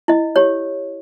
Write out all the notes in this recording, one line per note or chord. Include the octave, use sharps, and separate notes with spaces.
E4 D#5
G4 C#5